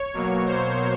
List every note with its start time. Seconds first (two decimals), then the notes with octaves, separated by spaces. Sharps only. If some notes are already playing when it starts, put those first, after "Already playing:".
Already playing: C#5
0.14 B2 F#3 A#3
0.46 C5